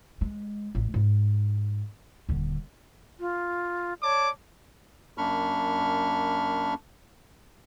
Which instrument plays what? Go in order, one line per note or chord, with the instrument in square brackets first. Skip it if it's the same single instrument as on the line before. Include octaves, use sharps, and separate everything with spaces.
[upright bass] G#3
A1
G#2
D#1 D3
[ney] F4
[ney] C#5 [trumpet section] D5 A5 D6
[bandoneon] F#2 A#3 D4 B5 C#6 F6